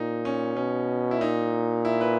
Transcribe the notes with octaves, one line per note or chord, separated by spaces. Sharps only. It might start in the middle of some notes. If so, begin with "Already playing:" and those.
Already playing: A#2 D#4
C#4
B2 C#4
E4
A#2 D#4
E4
B4